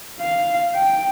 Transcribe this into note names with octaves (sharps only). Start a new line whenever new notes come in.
F5
G5